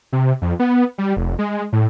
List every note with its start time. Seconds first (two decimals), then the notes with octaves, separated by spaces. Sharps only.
0.13 C3
0.42 F2
0.59 B3
0.98 G3
1.17 F1
1.39 G#3
1.73 A2